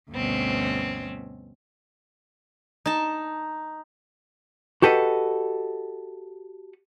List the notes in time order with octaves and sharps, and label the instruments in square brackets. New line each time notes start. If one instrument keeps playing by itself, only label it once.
[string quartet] D2 G2 B2 C4 C#4
[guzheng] D#4 A5
[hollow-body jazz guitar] F#4 G4 A4 B4 D#5 F#5